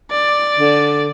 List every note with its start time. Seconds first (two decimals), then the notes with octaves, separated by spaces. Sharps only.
0.11 D5
0.59 D3